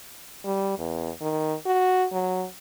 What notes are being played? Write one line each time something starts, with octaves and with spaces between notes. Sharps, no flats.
G3
E2
D#3
F#4
F#3